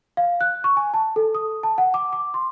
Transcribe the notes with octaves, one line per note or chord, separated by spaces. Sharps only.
F5
F#6
C#6
G#5
A5
A4
D#6
A5
F#5
D6
D6
C6